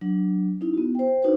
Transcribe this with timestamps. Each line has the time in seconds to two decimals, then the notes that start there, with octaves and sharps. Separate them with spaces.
0.01 F#3 D4
0.61 C#4 D#4 E4
0.74 B3 F#4
0.95 C5 G5
1.22 D4 D#4 F#4 B4 C5